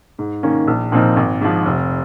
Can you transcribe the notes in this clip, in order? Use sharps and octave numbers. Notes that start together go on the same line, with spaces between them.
G#2
D#3 A#3 C#4
A#1
A#2 F3 C4 D#4
G#1
G#2 F3
F1